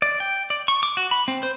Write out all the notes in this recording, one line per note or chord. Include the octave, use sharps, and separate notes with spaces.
D5
G5
D5
C#6
D6
F#4
B5
C4
C5